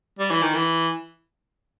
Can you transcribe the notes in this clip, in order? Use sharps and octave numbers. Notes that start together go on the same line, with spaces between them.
G3
E3
D#3
E3